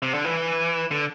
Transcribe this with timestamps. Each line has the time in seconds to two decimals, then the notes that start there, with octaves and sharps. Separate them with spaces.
0.02 C3
0.14 D3
0.25 E3
0.91 D3